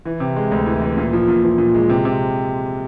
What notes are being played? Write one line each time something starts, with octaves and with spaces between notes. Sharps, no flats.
E3
C3
G#3
D2
E3
E3
A#2
F3
A#2
F3
A#2
G#3
C3
C3